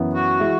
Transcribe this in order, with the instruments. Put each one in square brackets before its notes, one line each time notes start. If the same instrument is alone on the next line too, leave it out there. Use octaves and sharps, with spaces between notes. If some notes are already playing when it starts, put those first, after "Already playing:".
Already playing: [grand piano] F#2 E3 B3 E4
[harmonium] F#4
[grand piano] E3 G#3 E4